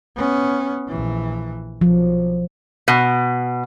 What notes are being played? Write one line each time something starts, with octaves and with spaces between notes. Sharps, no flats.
B3 C#4
A#1 E3
B1 F3
B2